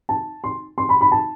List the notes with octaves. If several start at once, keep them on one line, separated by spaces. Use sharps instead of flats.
A5
C6
C6
B5
B5
A5